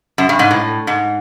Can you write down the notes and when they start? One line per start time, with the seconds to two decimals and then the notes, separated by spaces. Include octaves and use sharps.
0.18 F#2
0.29 G2
0.39 G#2
0.51 A2
0.87 G#2